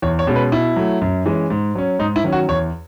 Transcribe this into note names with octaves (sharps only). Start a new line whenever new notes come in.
E2 C#5
C#5
B2 G#3 C#4
B4
B2 E4
F#3 A3
F#2
E3 G#3 C#4
G#2
F#3 C#4
G#2 D#4
E4
D#3 F#3 C#4
F#4
E2 C#5